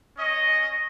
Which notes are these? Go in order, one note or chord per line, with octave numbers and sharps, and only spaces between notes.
C#4 D#5